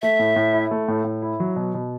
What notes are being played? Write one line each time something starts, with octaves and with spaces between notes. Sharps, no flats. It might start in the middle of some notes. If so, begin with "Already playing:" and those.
A3 E5
A2
A2
E4
A3
A2
A2
E4
F#3
B2
B2